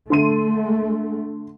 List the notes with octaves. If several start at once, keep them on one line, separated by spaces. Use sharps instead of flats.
D3 A3 C6 D#7